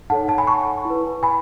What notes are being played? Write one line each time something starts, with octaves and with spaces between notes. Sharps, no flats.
D#4 A4 C#5 F#5 A5
F#5 A5
G#5 B5
A5 C#6
E4
B4
G#5 B5